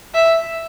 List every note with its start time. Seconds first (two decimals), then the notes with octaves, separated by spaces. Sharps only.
0.15 E5